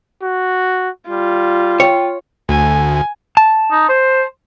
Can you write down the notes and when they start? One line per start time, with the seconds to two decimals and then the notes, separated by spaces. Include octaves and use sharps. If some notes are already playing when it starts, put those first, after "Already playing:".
0.22 F#4
1.10 G3 F4
1.80 C#5 G5
2.49 D2 G#5
3.37 A5
3.71 D#4
3.89 C5